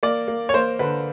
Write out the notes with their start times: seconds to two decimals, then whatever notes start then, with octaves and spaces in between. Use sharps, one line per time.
0.03 A#3 D5
0.28 A#3
0.49 C#5
0.54 A#3 C5
0.79 D3 B4